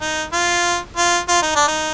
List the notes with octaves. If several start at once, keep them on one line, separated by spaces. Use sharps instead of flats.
D#4
F4
F4
F4
D#4
D4
D#4